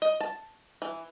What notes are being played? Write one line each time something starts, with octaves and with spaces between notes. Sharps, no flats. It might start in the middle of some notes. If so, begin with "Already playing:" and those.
D#5
A5
E3